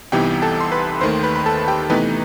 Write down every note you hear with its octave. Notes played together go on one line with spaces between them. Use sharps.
C2 C3 E3 B3 D#4 G4 G5
A4 A5
C6
B4 B5
D#2 D#3 A3 C5 C6
B4 B5
B5
A4 A5
G4 G5
C3 E3 A3 B3 D#4 B4